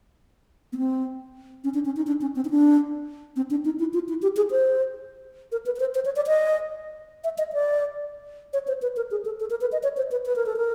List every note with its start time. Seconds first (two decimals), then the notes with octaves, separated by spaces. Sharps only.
0.73 B3
0.78 C4
1.64 C#4
1.74 D4
1.85 C#4
1.96 D#4
2.07 D4
2.21 C#4
2.36 C4
2.45 D#4
2.50 D4
3.36 C4
3.51 D4
3.65 D#4
3.79 E4
3.94 F4
4.09 E4
4.22 G4
4.37 G#4
4.51 C5
5.52 A#4
5.66 B4
5.76 B4
5.80 C5
5.95 C5
6.05 C#5
6.16 D5
6.27 D#5
7.24 E5
7.38 D#5
7.53 D5
8.53 C#5
8.67 C5
8.82 B4
8.97 A#4
9.11 G#4
9.25 A4
9.40 A4
9.50 A#4
9.61 B4
9.72 D#5
9.83 C#5
9.97 C5
10.11 B4
10.26 B4
10.36 A#4
10.46 A4
10.56 A#4